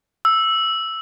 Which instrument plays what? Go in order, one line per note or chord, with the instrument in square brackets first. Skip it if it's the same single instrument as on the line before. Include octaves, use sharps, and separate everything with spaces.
[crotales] E6